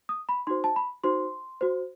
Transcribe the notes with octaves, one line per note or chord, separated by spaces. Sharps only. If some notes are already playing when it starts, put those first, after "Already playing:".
D#6
B5
D#4 F#4 C5 C6
A5
B5
D#4 F#4 C5 C6
F#4 C5